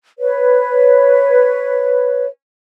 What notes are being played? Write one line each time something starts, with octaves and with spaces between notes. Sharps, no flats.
B4 C#5